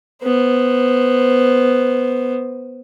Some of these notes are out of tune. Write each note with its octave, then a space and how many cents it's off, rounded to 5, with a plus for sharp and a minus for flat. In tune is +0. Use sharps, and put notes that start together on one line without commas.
B3 +0 C5 +0